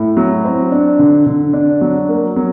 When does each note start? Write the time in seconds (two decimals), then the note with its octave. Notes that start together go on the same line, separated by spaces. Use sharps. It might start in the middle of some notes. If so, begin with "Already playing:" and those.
Already playing: A2
0.17 F#3
0.44 C4
0.71 D4
0.99 D3
1.26 D3
1.53 D4
1.81 F#3
2.09 A#3
2.36 F#3